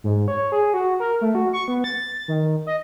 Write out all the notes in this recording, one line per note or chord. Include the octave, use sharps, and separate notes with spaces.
G#2
C#5
G#4
F#4
A#4
A3
F#4
C#6
B3
A6
D#3
D#5